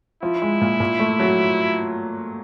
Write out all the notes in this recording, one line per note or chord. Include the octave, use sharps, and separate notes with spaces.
F3 E4
G#3
A#2
A#2
A3
F#3